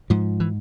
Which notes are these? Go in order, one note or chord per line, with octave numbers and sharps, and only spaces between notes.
G#2 F3
E3